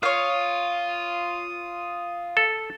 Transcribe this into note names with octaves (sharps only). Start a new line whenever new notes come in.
F4 C#5 F5 D#6
A4